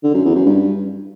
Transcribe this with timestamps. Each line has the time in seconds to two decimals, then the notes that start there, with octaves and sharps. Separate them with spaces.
0.03 D3
0.14 F#2
0.25 E2
0.35 F#2
0.46 G2